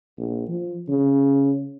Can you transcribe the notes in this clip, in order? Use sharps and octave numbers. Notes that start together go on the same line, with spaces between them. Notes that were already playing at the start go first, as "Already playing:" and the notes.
A#1
F3
C#3